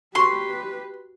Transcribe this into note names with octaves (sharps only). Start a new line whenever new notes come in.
F#4 G4 B4 C6 C#6